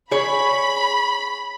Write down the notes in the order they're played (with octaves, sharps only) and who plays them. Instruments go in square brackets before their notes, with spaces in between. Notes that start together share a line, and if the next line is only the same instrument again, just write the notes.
[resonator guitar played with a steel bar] G#4 C#5 [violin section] B5